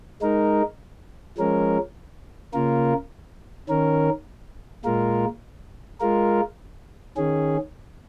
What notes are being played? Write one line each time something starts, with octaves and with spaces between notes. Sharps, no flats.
G#3 D#4 A#4
F3 G#3 C#4 A#4
C#3 A#3 F4 A#4
D#3 C#4 A#4
A#2 G#3 F4 A#4
G#3 F4 A#4
D#3 C#4 G#4